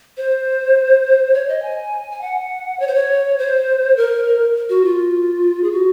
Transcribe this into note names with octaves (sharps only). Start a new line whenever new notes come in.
C5
C#5
D#5
G#5
G#5
F#5
C#5
C5
C#5
C5
A#4
F#4
F4
G#4
F#4